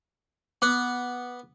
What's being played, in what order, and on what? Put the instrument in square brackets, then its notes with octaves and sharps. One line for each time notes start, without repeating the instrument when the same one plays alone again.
[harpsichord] B3 [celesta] D6 F#6